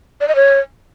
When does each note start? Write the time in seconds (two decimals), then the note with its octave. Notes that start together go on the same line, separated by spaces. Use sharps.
0.21 D5
0.28 D#5
0.36 C#5